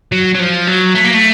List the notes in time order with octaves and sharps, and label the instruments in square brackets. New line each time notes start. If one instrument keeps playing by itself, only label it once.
[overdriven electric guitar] F#3
F#3
F3
F#3
A3
A#3
A3